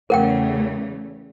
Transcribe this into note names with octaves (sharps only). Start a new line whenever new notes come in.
E2 C#3 A3 A#4 F#5 G5